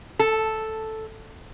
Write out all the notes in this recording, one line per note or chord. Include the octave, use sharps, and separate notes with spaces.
A4